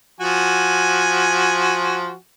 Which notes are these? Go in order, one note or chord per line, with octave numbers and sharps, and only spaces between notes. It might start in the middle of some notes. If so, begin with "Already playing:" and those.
F3 F#4 G#5